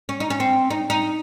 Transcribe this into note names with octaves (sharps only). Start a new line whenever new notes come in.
C#4
D#4
C#4
C4
D#4
D#4